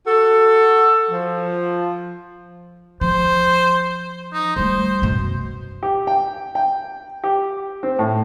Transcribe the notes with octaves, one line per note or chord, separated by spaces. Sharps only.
F#4 A4
F3
F3 C5
D#4
G3 A3 C5
F#2 B2
G4
G5
G5
G4
C4
A2